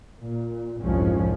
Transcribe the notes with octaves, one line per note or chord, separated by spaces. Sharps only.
A#2
F1 C2 G#2 F3 C#4